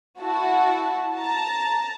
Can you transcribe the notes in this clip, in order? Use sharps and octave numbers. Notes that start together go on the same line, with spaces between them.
E4 F#4 A5
A5 A#5